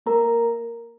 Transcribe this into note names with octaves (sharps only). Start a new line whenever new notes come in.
A#3 A#4 A#5